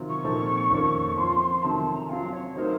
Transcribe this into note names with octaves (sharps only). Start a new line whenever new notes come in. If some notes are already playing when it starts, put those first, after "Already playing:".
Already playing: C3 D#3 F#3 C4 F4
C#6
A#2 F3 C4 D#4 A4
F2 D#3 A#3 C#4 A4
F3 C4 F4 C6
C3 D#3 F#3 A3 C4 A5
A5
A#5
F#3 C4 F4 F5
C#5
F#3 A3 D#4 A#4 C5